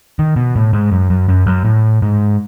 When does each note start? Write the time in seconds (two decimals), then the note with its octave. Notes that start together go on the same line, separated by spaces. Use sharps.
0.19 D#3
0.36 B2
0.56 A2
0.73 G#2
0.92 F#2
1.10 F#2
1.28 F#2
1.47 F#2
1.65 A2
2.02 G#2